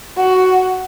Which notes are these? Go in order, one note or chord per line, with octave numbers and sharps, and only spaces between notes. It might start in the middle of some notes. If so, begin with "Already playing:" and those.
F#4